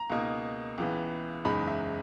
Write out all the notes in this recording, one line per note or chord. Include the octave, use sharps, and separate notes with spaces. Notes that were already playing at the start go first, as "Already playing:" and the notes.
Already playing: A#5
C#2 B2 A#3 D#4
C#2 C#3 E3 B3
F#1 E2 C#3 G#3 D#4 B5
E5